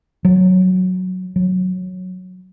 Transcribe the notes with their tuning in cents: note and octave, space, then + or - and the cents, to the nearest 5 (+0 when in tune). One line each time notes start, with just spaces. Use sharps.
F#3 -5
F#3 -10